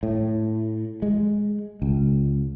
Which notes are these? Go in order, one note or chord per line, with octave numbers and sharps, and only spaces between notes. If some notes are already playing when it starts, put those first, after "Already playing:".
A2
G#3
C#2